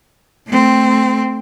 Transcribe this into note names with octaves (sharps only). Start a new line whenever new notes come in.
A3 C4